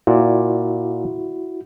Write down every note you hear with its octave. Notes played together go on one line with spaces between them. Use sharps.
A#2 E4 F#4 D5